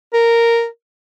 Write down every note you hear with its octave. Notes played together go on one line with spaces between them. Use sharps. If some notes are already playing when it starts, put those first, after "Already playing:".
A#4